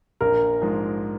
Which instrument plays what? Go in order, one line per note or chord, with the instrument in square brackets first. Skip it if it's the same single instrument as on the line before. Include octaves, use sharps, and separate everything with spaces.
[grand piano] A#1 [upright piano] A#4
[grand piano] G#2 F3 G#3